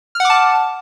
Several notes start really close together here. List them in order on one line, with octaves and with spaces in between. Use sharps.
F6 F#5 D6 A5